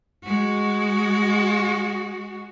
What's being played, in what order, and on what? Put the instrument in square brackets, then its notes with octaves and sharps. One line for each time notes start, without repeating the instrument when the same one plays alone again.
[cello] G#3 F#4